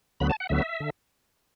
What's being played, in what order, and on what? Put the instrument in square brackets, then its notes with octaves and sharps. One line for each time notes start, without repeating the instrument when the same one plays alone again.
[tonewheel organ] D2 D3 F#3 B3 B5
A5
F#5
D2 D3 F#3 B3 E5
D3